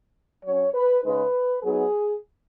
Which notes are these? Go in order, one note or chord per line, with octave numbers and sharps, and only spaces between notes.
F#3 C#4 C#5
B4
C#3 G#3 D#4 B4
F#3 B3 D#4 G#4